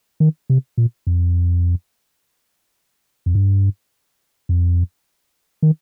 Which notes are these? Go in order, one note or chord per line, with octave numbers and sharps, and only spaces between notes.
D#3
C3
A#2
F2
F2
G2
F2
D#3